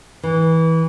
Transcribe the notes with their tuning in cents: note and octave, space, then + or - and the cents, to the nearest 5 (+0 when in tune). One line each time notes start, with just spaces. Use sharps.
E3 -20